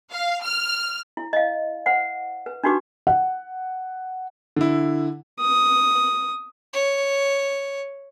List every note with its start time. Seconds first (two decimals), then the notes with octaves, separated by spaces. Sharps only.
0.11 F5
0.43 F6
1.17 E4
1.33 D#5 F5
1.86 C5 F#5
2.46 B4
2.64 D4 D#4 F#4 G4 B4 D6
3.07 F#5
4.56 D3 E4
5.40 D#6
6.73 C#5